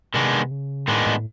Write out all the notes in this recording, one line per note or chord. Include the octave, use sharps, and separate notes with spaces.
C3 D#3 G#3 B3 D4
C#3
A2 D#3 G#3 B3 D4
A2